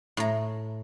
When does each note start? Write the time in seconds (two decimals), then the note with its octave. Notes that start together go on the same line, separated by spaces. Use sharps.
0.17 A2 A#5